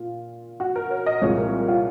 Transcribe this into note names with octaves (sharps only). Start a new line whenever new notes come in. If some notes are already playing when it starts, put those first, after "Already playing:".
Already playing: A#2 F4
F#4
A#4
C#5
D#5
C2 A#2 F3 G#3 C#5
A#4
F4